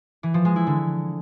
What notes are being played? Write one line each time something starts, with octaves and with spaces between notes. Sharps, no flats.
E3
F3
G#3
E4
D3